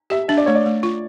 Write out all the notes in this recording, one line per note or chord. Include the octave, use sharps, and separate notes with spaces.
G4 E5
D4 E5
D5
A3 C#5
D5
A3
F4